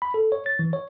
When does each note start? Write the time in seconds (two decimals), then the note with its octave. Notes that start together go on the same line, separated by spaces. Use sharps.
0.02 B5
0.14 A4
0.32 C#5
0.46 A6
0.59 E3
0.73 C#5